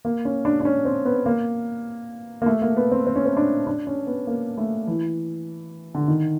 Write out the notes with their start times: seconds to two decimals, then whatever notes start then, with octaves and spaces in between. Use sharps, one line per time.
0.05 A#3
0.25 C#4
0.45 D4
0.60 D4
0.65 C#4
0.85 C4
1.05 B3
1.26 A#3
2.42 A#3
2.46 A3
2.62 A#3
2.77 B3
2.91 C4
3.07 C4
3.16 C#4
3.26 C4
3.37 D4
3.67 D4
3.87 C#4
4.07 B3
4.27 A#3
4.58 A3
4.87 E3
5.95 D3
6.08 D#3